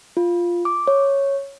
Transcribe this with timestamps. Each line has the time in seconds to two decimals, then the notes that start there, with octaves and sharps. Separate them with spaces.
0.17 F4
0.65 D6
0.87 C#5